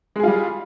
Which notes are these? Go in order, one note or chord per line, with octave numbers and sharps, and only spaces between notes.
G3 G#3 F4 G#4